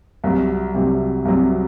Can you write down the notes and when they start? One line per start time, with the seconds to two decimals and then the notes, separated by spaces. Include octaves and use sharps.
0.24 C2 C3 F#3
0.74 C2 C3 F#3
1.25 C2 C3 F#3